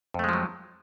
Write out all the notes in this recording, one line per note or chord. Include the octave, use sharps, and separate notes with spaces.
F2 F3 F#3 G#3 A3